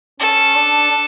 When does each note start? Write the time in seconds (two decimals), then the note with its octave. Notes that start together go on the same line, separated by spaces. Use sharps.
0.20 C#4 A4
0.55 D4
0.91 D4